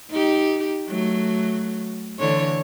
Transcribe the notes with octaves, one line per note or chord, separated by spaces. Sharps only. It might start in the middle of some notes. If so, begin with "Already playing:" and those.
D#4 G4
F#3 A3
D3 E3 C#5